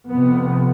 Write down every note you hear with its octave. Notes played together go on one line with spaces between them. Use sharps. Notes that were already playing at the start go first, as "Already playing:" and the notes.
F2 C3 B3